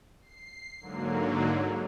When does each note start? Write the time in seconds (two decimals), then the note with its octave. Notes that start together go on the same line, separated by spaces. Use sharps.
0.21 C7
0.80 G#2 D3 F#3 A#3